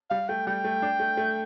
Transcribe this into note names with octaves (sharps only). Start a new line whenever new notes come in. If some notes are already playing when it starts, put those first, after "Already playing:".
G3 F5
A3 G5
G3 G5
A3
D4
A3
A3